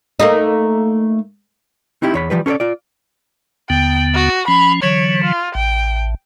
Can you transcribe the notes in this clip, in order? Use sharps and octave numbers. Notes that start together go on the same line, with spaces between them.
A3 A#3 D#4
C4 D#4 E4 G4
E2 C#5 B5
E3 F3 G3 B4
C#4 A4 B4 C#5 D5
F4 D5
D#2 D3 B3 G5
F#4
F3 C#4 B5
D3 E3 F#3 C#5
F4
A1 G5